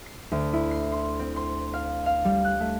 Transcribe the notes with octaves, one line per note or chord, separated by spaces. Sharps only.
C7
D2
E4
C7
C6
C4
C6
F5
F5
G3
F#6
A3